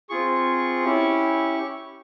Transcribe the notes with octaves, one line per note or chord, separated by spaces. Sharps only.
C4 F4 G#4 C#6
C#4 E4 G4